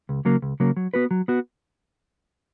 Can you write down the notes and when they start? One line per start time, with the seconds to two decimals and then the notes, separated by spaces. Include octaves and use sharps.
0.09 C#2
0.25 C#3 F#3 A#3
0.42 C#2
0.60 C#3 F#3 A#3
0.77 F#3
0.94 B3 F#4 B4
1.11 F#3
1.28 B3 F#4